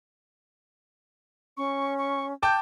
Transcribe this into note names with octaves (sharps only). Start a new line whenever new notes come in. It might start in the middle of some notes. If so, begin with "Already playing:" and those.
C#4 C#6
C#6
G5 A5 D6 G6